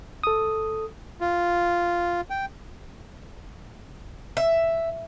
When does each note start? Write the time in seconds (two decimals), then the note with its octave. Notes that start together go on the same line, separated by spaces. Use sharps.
0.24 A4 D#6
1.21 F4
2.30 G5
4.37 E5